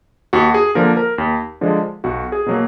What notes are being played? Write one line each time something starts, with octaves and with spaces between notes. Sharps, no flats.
D#2 F#4
G#4
D3 F3 A#3 A#4
A#4
D#2
D3 F3 G#3
B1 F#4
G#4
B2 F#3 A#3